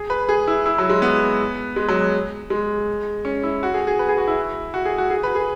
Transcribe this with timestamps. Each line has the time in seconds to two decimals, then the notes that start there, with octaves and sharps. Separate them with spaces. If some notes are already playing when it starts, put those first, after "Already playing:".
Already playing: G#4
0.10 B4
0.29 G#4
0.47 E4
0.66 E4
0.78 F#3
0.90 G#3
1.02 B3
1.76 G#3
1.89 F#3
2.50 G#3
3.25 C#4
3.43 E4
3.63 F#4
3.74 G#4
3.87 G#4
3.99 B4
4.09 G#4
4.18 F#4
4.28 E4
4.74 F#4
4.85 G#4
4.98 F#4
5.10 G#4
5.23 B4
5.35 G#4